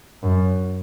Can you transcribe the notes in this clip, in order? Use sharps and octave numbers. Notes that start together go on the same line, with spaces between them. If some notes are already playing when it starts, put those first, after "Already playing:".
F#2